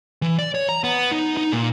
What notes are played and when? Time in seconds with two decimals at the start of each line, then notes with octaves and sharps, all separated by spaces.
0.22 E3
0.39 D5
0.55 C#5
0.69 A#5
0.84 B3
1.11 D#4
1.37 D#4
1.52 A#2